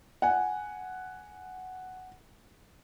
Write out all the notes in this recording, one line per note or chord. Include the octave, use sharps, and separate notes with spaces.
F#5 G#5